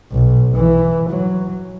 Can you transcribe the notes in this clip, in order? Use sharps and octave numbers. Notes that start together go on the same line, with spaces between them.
B1
E3
F#3